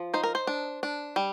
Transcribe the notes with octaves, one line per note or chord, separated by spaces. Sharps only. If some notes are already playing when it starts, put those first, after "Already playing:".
Already playing: F3
D#4 C5
A#4
C5
D4
D4
G3